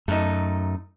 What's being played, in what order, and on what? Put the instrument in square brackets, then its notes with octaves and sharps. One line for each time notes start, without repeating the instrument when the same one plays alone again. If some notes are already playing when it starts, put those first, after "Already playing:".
[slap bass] F#2 [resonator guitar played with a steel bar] A3 D#4